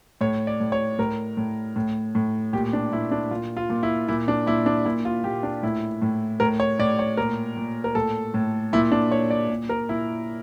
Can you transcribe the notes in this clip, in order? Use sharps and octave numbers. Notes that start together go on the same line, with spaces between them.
A2 C#5
D5
A2
C#5
A2 A#4
A2
A2
A2
A#2 G4
D4
A#2 E4
D4
A#2 F4
F4
A#2
E4
A#2 E4
D4
A#2 E4
D4
A#2 E4
F4
A#2 G4
D4
A2 E4
A2
A2 A#4
C#5
A2 D5
C#5
A#2 A#4
A#2
A#4
A2 A4
A2
A#2 E4
D4
A#2 C#5
D5
A#2
A#4
A#2 E4